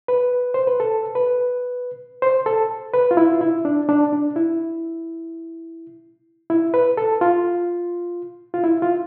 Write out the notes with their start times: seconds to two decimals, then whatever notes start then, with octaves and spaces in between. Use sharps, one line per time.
0.08 B4
0.54 C5
0.67 B4
0.80 A4
1.15 B4
2.22 C5
2.46 A4
2.94 B4
3.11 F4
3.17 E4
3.32 F4
3.41 E4
3.65 D4
3.89 D4
4.13 D4
4.36 E4
6.50 E4
6.74 B4
6.97 A4
7.21 F4
8.54 F4
8.64 E4
8.82 F4